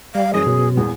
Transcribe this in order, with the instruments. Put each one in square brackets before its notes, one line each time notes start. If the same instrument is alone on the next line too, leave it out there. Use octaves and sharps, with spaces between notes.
[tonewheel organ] G3 [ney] F5
[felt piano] F#2 E3 [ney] G#4 [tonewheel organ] D#5
[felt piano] F#2 [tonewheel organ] B2
[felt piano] A#1 E2 [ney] G#4